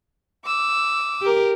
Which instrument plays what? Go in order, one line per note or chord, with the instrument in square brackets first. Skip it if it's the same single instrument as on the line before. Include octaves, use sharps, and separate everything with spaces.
[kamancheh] D6 E6
[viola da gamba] G4 A#4